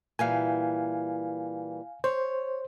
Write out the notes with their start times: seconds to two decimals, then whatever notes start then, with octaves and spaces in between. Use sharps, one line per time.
0.19 A#2 E3 G3 F5 G#5
2.04 C5 C#5